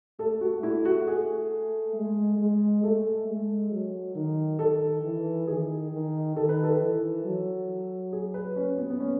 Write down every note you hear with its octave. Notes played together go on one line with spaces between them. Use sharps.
A3 A4
F#4
A3 E4
F#4
G#4
G#3
G#3
A3 A4
G#3
F#3
D#3
D#3 A4
E3
D#3 G#4
D#3
D#3 A4
B4
A4
E3
F#3
G#4
B4
C#4
B3
B3
C#4